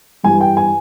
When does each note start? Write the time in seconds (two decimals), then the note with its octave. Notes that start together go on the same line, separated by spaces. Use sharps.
0.24 G2 E3 G3 G#5
0.41 G5
0.57 G#5